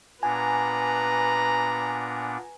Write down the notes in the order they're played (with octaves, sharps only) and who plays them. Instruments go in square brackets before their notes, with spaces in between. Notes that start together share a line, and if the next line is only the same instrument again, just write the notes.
[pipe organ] A#2 B3 D4 [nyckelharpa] B4 A#5 [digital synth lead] G#5